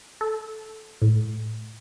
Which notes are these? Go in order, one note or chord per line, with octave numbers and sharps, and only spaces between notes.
A4
A2